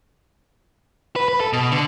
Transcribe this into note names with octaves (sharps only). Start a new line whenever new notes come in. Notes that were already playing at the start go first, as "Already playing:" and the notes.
B4
B4
A4
B2
D3